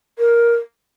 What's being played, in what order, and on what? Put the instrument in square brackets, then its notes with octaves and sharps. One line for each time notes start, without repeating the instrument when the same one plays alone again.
[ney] A#4